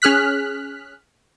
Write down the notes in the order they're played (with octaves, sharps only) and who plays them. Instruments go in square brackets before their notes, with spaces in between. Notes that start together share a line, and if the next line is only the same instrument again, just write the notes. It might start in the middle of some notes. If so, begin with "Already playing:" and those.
[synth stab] C#4 G#4 F6 F#6 B6